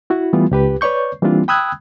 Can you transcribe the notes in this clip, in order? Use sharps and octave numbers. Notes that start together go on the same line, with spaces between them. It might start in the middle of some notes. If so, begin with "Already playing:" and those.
E4 F#4
E3 G3 A3 B3 F4
C#2 G4 B4
B4 C#5 D5 C#6 G6
E3 G3 A#3 C4 D4 F4
G5 B5 D#6 E6 F#6 G#6